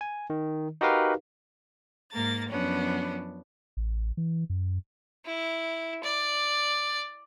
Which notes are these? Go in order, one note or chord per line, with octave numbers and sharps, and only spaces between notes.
G#5
D#3
D#4 F#4 G4 A#4 B4 F5
G#2 A#3 A#4 A6
F#2 F3 B3 C#4 D4
A1
E3
F#2
E4
D5